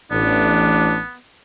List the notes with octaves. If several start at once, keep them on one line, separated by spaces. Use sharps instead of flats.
A1 B3 D4